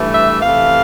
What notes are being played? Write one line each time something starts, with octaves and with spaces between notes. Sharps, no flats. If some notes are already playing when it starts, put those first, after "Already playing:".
Already playing: G2 E3 A3
E5
C3 E3 A3 F5